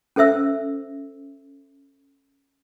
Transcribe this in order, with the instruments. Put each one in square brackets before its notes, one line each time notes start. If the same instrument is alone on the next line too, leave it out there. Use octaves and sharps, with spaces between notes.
[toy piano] C#4 A4 C5 E5 E6